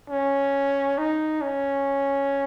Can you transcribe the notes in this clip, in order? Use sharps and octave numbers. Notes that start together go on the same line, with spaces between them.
C#4
D#4
C#4